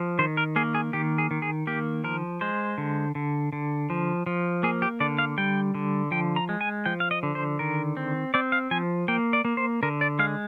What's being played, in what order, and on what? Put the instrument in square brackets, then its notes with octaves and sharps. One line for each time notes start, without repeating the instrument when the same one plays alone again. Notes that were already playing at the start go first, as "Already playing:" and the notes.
Already playing: [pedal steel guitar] F3
D#3 C5
A#4
A#3 G#4
G#4
D#3 G4
G#4
D#3
G#4
A#3 G4
F3 A#4
G#3 C5
D3
D3
D3
F3
F3
A#3 G#4
G4
D3 D5
F5
G3 G5
D3
F3 G5
A#5
G#3
G#5
F3 G5
F5
D#5
D3
C5
D#3 A#4
C4
C4 D5
F5
F3 G#5
A#3 G5
D5
A#3
C5
D3 A#4
D5
G#3 F5